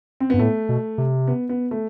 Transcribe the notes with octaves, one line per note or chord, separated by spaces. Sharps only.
C4
G2 B3
A2 A3
B2
C3
B3
B3
A3